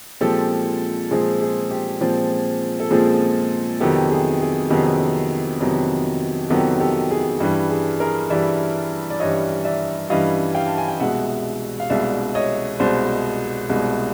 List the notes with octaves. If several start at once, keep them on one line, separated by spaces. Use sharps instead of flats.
A#2 F3 G#3 C4 G4 A4
A#2 F3 G#3 C4 G#4
G#4
G4
A#2 F3 G#3 C4
A4
A#2 F3 G#3 C4 G#4
F2 C3 D#3 F#3 B3 G4 A4
G#4
G#4
F2 C3 D#3 F#3 B3 G#4
F2 C3 D#3 F#3 B3
F2 C3 D#3 F#3 B3 G4 A4
G4 A4
G#4
G2 E3 G3 G4
G#4
G#4 A#4
G2 E3 G3 D5 E5
D5
G2 E3 G3 C#5 D#5
D5 E5
G2 E3 G3 D#5 F5
F5 G5
A5
G#5
G5
C2 B2 G#3 E5 F#5
F5
C2 B2 G#3 D5 E5
C#5 D#5
C2 B2 G#3 C5 D5
C2 B2 G#3